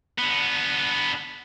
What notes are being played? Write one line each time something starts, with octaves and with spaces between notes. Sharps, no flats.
D3 B3